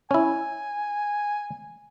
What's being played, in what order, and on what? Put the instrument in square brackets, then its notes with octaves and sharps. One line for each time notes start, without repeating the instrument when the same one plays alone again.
[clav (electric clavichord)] C#4 E4 [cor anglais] G#5